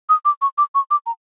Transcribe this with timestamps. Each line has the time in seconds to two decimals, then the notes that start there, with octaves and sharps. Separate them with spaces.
0.09 D#6
0.25 D6
0.42 C#6
0.58 D6
0.75 C#6
0.91 D6
1.06 A#5